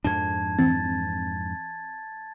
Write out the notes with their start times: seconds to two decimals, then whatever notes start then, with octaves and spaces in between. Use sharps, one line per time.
0.04 F2 G#2 D4 A5 G#6
0.59 E3 C4 A6